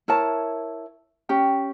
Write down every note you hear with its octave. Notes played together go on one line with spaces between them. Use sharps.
E4 A#4 C#5 A5
C#4 G4 G5